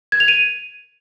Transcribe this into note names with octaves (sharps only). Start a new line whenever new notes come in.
G#6
F7
D#7